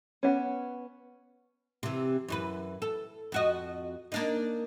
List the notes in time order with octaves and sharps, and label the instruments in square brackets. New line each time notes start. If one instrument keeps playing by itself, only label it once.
[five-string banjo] B3 C#4
[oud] C3 E3
F#2 E3 B4
A4
F2 F#4 D#5
A#3 D4 D#4